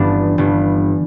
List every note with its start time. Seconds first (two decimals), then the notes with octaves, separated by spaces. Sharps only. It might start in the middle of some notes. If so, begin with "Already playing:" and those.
Already playing: G1 G2 E3 B3 D4
0.38 G1 G2 E3